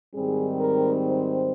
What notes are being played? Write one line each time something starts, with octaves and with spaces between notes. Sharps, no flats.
G#2 D#3 G3 C4 G#4
A#4
C5